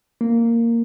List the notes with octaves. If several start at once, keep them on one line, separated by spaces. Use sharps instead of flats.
A#3